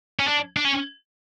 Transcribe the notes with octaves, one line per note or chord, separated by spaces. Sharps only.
C#4
D4
D4
C#4